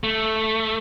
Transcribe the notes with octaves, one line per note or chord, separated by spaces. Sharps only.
A3